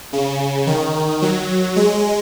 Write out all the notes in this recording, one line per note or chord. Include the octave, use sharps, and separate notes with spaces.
C#3
D#3
F#3
G#3